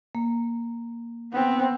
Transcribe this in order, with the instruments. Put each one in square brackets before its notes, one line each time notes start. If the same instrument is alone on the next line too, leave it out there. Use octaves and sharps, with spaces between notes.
[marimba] A#3
[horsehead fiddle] B3 C4